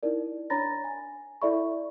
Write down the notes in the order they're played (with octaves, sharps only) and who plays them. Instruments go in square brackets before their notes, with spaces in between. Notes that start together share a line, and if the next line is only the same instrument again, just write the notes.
[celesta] D#4 E4 A#4 D5
D4 C#5 A#5 B5 A6 A#6
G#5
E4 A4 D5 E5 B5 C#6